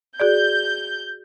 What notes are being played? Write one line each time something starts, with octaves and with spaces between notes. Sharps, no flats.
F#4 G#4 D5 G6